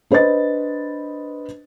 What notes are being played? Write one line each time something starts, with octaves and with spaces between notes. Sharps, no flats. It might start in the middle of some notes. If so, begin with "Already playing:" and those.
D4 B4 C5 D#5 A6